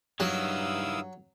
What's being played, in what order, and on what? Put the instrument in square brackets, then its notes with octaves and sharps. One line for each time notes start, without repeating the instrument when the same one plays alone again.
[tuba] G2 [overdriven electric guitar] D#3 E4 [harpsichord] F#3 [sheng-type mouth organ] F5 D#6 E6